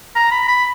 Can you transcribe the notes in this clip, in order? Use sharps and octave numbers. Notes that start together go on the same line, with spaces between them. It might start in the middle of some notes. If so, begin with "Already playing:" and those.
A#5
B5
B5